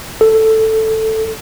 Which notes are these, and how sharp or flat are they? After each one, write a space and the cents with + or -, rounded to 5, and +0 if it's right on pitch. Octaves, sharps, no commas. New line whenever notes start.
A4 +5